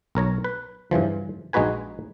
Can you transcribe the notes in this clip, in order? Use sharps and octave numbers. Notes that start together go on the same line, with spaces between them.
B1 A#4 C#5 A#5
B4
G2 C#3 E3 F3
A#1 G#3 D#4 F#4 B4 G#5